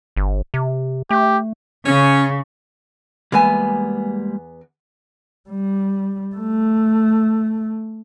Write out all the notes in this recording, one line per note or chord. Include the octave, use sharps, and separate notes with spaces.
G1
C3
A3 G4
C#3 C#4
E2 G3 G#3 A#3 B3 G#5
G3
A3